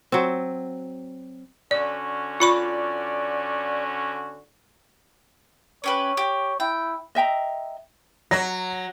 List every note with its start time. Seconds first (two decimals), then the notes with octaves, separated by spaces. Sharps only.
0.12 F#3 C4
1.71 D3 C#4 F#4 D5
2.40 F4 D5 B5 C#6
5.84 C#4 G4 B4 C#5
6.17 G4
6.60 E4 G5
7.15 D#5 E5 G5 A#5
8.31 F#3 A#6